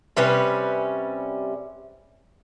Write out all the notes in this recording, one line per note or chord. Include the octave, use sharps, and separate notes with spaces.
C3 G3 C#4 B4